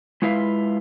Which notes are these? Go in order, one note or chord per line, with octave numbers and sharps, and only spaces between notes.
G#3 E4 F4 B4 E5 F5